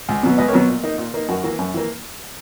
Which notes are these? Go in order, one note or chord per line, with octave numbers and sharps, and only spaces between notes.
C#2
B2 F#3 B3
C#2 B4 D#5
A#4 C#5
B2 F#3 B3
A#2
A#3 D#4
A#2
A#3 D#4
F#2 F#4 A#4
E3 A#3
F#2
E3 A#3